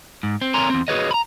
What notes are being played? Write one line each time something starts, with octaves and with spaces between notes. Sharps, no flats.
G#2
C4
C4 A#4 C#5 G#5 A#5 C6
E2 C4
F#4 G#4 B4 C#5 D#5
A#5 B5